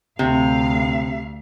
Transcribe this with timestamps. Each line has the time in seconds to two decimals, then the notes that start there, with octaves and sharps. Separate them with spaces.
0.19 D2 C3 F5